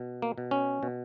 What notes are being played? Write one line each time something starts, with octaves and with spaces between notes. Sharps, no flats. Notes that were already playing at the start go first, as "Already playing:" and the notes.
Already playing: B2
A#3
B2
C#4
B2